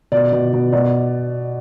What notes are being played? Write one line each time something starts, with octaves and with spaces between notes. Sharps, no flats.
B2 D5
B2
B2
B2 D5